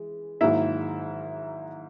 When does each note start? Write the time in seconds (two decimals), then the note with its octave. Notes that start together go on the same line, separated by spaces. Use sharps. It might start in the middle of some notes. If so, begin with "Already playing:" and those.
Already playing: E3 G#3
0.41 G#2 D#3 F#3 A#3 E4 E5